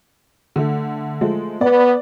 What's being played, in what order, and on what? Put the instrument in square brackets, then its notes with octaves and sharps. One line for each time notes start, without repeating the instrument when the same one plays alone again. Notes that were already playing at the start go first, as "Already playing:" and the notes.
[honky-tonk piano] D3 A3
F3 G#3 A3
[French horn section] B3 [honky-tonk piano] D5